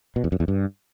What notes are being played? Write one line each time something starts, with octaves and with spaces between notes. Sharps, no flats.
B2
E2
F#2
E2
G2